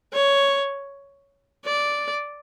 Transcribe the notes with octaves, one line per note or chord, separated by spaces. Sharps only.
C#5
D5